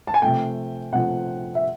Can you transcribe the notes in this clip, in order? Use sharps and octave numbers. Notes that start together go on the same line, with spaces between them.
A5
G#5
C3 F3 A3 G5
C3 F3 A3 F#5
E5